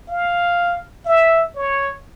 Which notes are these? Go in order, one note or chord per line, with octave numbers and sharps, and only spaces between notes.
F5
E5
C#5